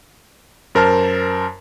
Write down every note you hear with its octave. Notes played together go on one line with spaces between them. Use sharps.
F#2 A#4 C5 A5 F6